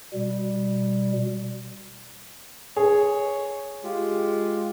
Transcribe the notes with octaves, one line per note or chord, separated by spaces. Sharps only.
B2 G3
G#4 C#5
G#3 F4 G4